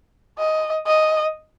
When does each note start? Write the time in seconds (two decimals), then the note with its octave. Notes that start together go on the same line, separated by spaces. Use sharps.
0.38 D#5
0.87 D#5